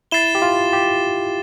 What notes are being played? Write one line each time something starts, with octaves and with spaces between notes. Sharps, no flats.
E4 A6 C7 E7 G7
G4
F4
G4